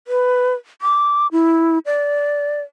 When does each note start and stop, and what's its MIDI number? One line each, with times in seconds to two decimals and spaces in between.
0.08 0.54 71
0.82 1.27 86
1.32 1.79 64
1.86 2.61 74